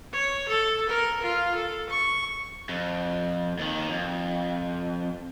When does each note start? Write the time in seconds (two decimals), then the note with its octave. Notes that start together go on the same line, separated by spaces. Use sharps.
0.13 C#5
0.49 A4
0.89 A#4
1.22 F4
1.55 A4
1.89 C#6
2.69 F2
3.59 D#2 D#3
3.90 F2